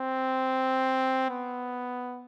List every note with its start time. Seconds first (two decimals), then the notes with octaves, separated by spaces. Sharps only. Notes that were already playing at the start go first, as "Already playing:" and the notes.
Already playing: C4
1.30 B3